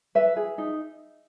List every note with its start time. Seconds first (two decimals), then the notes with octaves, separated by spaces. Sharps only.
0.15 B4 E5
0.36 G#4
0.58 D#4